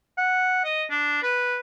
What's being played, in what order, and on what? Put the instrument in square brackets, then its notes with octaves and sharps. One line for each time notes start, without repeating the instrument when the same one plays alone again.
[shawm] F#5
D#5
D4
B4